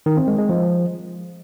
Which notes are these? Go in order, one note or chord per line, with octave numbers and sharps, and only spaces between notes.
D#3
C4
G#3
G#3
F3